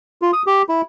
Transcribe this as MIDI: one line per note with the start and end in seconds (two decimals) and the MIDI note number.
0.22 0.31 65
0.33 0.42 87
0.47 0.62 67
0.69 0.82 64